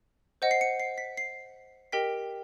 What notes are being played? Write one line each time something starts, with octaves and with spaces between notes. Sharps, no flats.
C5 D#5 F#5 C#7
C7
C#7
C7
B6
C7
G4 A#4 D#5 G5 B6